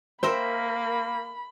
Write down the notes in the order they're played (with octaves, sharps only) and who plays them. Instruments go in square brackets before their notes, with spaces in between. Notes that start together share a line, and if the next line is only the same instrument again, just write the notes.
[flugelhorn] A#3 [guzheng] A#4 E5 G5 [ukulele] C5 [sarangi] B5